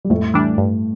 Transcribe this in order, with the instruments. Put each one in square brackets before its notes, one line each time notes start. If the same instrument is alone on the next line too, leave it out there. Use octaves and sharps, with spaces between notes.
[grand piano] G3
[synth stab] F2 [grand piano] A2 A3
[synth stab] E3 G3 D4
G2